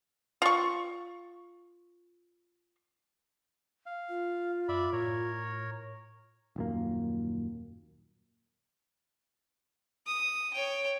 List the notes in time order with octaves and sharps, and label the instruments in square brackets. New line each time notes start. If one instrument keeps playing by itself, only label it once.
[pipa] F4 C#6
[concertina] F5
[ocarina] F4
[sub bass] F#2 [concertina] D5 E5 B5
[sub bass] A2 [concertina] A#4 C#5
[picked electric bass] D#1 F#2 A#3
[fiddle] D#6
C#5 G5